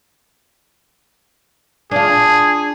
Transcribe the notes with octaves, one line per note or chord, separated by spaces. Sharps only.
D4 F4 G#4